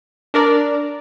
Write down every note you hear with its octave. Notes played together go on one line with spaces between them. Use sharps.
D4 A#4 D5